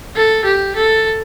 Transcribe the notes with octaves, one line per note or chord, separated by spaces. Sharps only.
A4
G4
A4